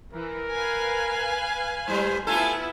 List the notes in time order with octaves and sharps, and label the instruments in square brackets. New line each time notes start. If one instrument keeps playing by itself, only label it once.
[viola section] E3 [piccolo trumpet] A#4
[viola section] B4 F5 G#5
[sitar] G#2 G3 [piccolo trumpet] C5
[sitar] A3 F4 A4 [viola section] B3 E4 [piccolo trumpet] G#5